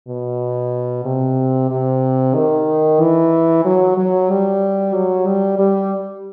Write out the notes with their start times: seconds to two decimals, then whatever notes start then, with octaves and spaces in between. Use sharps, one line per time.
0.08 B2
1.05 C3
1.71 C3
2.35 D#3
3.00 E3
3.65 F#3
3.97 F#3
4.30 G3
4.94 F#3
5.26 G3
5.59 G3